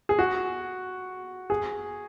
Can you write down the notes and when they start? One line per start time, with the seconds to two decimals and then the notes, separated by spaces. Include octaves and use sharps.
0.09 G#4
0.19 F#4
1.50 G#4